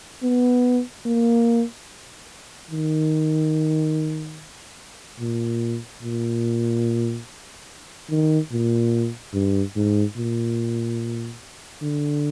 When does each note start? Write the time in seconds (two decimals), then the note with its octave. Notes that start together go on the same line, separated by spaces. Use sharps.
0.23 B3
1.06 A#3
2.71 D#3
5.20 A#2
6.03 A#2
8.10 D#3
8.52 A#2
9.34 G2
9.76 G#2
10.17 A#2
11.82 D3